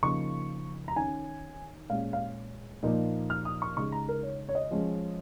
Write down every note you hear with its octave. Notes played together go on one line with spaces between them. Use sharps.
C#3 F3 A#3 D#4 C#6
A#5
D#3 C#4 G#5
A#2 G#3 C#4 F5
F5
A#2 F3 A#3 D#4
F6
D#6
C#6
C#3 G#3 D#4 C#6
A#5
A#4
C#5
C#5
D#5
F3 G#3 C#4